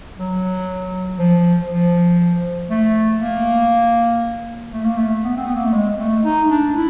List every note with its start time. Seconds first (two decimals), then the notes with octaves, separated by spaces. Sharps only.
0.18 F#3
1.19 F3
1.69 F3
2.70 A3
3.20 A#3
4.73 A3
4.85 A#3
4.97 A3
5.24 B3
5.37 C4
5.46 B3
5.56 A#3
5.65 A3
5.73 G#3
6.00 A3
6.24 D#4
6.50 D4
6.75 E4